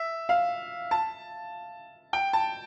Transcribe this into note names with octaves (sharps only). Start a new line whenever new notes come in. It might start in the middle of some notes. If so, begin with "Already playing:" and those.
Already playing: E5
F5
A5
G5
A5